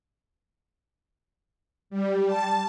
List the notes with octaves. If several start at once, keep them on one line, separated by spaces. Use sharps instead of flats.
G3
A5